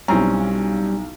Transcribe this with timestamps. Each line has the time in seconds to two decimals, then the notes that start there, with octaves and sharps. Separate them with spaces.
0.08 B1 G3 C4 C#4 E4 A#5